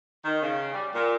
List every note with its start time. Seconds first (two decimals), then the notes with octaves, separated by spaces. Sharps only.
0.25 D#3
0.43 C#3
0.74 G3
0.95 A#2